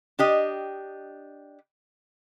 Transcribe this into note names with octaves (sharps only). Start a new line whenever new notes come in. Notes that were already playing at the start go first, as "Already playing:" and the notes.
D4 G4 D#5